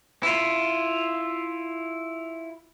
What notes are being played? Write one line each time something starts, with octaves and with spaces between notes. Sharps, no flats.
E4 F4